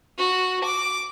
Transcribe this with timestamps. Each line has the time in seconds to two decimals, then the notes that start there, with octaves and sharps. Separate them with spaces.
0.19 F#4
0.64 D6